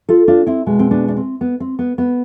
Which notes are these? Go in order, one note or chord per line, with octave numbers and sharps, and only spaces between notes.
F4 A4
D4 F4
C4 E4
B2 G#3
C4
B3 D4
D4
C4
B3
C4
B3
B3